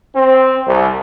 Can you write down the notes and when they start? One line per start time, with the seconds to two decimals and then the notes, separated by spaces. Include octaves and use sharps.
0.16 C4
0.67 C2